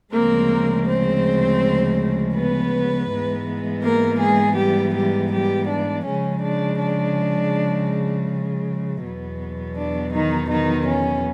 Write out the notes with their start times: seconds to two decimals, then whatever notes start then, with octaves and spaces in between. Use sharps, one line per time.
0.12 D2 C#3 F3 G#3 A#3 C4 A#4
0.87 C4 C5
2.35 B3 B4
3.09 G#2 E3 G#3 B3
3.83 A#3 A#4
4.20 G#3 G#4
4.57 G3 G4
4.95 G3 G4
5.32 G3 G4
5.68 D4
6.06 C#3 F3 G#3 C#4
6.43 D4
6.80 D4
9.02 E2 B2 F#3 B3
9.76 D4
10.13 D#3 D#4
10.50 D#3 D#4
10.87 C#4